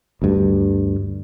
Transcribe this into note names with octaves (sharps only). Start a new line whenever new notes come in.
D2 G2